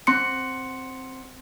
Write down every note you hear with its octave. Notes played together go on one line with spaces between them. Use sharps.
C4 C6 C#7